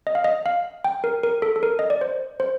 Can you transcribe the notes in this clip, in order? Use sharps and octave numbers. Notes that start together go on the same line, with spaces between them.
D#5
F5
D#5
F5
G5
A#4
A#4
A4
A4
A#4
D#5
D5
C5
C5